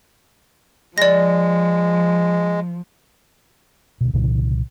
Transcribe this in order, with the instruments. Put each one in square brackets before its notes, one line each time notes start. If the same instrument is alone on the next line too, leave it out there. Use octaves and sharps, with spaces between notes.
[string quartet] F3 [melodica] G#3 [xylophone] D5 A#6
[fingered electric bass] D2 B2
C2 A#2 C#3 E3